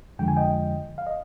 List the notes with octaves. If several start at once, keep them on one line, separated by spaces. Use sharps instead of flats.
F2 D3 F3 G#3 G5
G#5
D#5 G5
F5
D#5